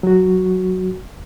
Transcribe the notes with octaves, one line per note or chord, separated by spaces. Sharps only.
F#3 F#4